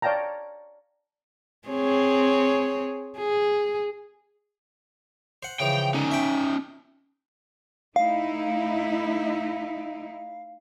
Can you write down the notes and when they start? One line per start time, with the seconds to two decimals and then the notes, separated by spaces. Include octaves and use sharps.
0.02 C#5 D5 F5 G5 A5 A#5
1.68 C4 G#4 C#5
3.18 G#4
5.43 C5 F#5
5.60 C#3 E3 F3 G5
5.94 D3 C#4 D#4
6.11 E5 G5
7.96 A3 D#4 E4 F5